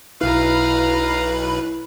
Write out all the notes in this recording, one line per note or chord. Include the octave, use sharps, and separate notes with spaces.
B1 E4 B4 F5 A#5